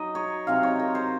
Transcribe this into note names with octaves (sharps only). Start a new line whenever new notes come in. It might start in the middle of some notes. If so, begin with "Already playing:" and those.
Already playing: F#3 D#4 D#5
C#5
C3 F#3 C4 D#4 F5
C#5
A#4
C5